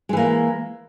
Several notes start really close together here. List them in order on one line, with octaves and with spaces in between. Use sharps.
G#3 E3 A#3